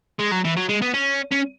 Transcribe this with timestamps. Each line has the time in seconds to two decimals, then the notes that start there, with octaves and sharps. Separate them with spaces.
0.19 G#3
0.31 F#3
0.44 E3
0.56 F#3
0.69 G#3
0.82 B3
0.94 C#4
1.32 C#4